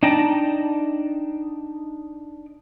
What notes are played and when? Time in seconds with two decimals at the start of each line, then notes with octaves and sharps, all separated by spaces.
0.03 D4 D#4 G5 A5 A#5